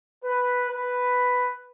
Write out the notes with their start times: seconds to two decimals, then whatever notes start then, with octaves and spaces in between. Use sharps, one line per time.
0.23 B4
0.70 B4